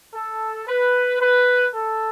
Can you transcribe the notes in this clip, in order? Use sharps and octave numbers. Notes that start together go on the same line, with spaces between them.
A4
B4
B4
A4